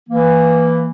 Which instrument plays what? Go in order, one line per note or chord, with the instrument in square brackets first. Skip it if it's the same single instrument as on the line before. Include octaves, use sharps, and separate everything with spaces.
[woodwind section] E3 A#3